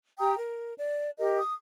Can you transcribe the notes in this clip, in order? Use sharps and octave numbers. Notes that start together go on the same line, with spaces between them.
G4 G5 A#5 D#6
A#4
D5
G4 A#4 D#5
D#6